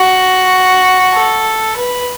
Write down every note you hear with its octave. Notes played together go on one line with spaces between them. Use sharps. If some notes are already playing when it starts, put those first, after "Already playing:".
Already playing: F#4
A4
B4